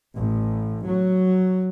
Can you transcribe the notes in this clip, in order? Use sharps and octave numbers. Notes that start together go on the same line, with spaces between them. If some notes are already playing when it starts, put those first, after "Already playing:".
A1
F#3